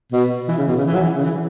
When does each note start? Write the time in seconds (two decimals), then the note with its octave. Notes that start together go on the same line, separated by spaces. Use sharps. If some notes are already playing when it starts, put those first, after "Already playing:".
0.12 B2
0.48 E3
0.58 C#3
0.68 B2
0.77 C#3
0.85 E3
0.94 F#3
1.01 E3
1.16 C#3
1.23 E3